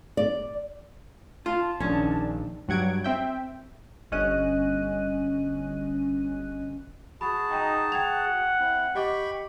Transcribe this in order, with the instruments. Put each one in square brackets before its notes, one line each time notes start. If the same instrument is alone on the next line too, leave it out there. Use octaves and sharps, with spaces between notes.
[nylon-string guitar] D5
[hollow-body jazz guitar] F4 [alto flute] A5
[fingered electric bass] A#1 [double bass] D#3 D4 [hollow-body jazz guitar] C#4
[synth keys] G2 F#3 F#5 G#6 D7
C4 E5 G5
G1 C#4 D#5 F#6 D#7
[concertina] F#4 G#4 A5 [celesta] B5
[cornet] D#4 [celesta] G5 A#5
[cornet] F#5 [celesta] G5 G#6 F7
[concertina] C4 E4
[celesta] G4 D#5 D6 [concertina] G5 B5 C#6